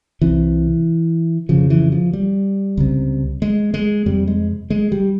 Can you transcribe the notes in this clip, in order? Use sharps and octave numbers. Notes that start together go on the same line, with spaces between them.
C2 C3 E3
F2 C#3 F3
E3
F3
G3
C#2 C3
G#3
G#3
F2 C3 G3
G#3
G#3
G3